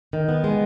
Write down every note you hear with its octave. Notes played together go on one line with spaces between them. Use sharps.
D#3
B3
G#3